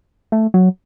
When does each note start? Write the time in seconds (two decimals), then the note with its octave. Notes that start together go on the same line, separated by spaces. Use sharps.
0.32 A3
0.54 F#3